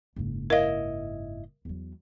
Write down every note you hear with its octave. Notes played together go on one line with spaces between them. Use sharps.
F#1 G#2
E4 A#4 D#5 F5
E2 F#3